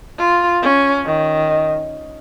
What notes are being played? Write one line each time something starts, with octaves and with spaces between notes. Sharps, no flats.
F4
C#4
D#3